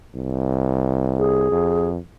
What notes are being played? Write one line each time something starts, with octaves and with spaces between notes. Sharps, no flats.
C2
G#4
F2